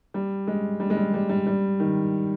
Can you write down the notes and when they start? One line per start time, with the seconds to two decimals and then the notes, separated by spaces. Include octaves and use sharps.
0.14 G3
0.47 G#3
0.80 G3
0.90 G#3
0.97 G3
1.14 G3
1.29 G3
1.47 G3
1.80 D#3